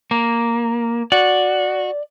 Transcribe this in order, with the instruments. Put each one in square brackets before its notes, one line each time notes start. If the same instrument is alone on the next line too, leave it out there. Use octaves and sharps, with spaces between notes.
[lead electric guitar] A#3
[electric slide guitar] F#4 [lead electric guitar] D5